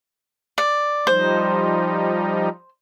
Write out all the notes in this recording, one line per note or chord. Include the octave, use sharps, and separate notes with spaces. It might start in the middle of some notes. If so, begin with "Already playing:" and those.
D5
F3 G3 D#4 C5